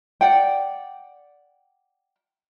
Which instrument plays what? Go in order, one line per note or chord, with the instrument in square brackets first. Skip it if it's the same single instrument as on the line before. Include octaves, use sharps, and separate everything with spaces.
[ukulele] D5 F#5 G5